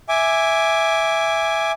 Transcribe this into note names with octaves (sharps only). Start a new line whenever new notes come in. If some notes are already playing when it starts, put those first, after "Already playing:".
E5 G#5 D6